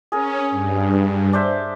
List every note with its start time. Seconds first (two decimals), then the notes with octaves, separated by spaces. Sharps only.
0.12 C#4 G#4 A#4
0.51 G2
1.33 D4 C5 E5